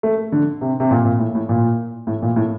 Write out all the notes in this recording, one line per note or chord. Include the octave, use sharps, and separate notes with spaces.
A3
D3
C3
C3
A#2
A#2
A2
A2
A#2
A2
A#2
A2